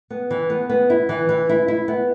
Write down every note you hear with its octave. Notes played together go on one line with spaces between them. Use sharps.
B3
E3
B3
B3
E4
E3
E3
E4
E4
B3